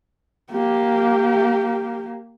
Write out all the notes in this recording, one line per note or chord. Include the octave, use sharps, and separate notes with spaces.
A#3 G4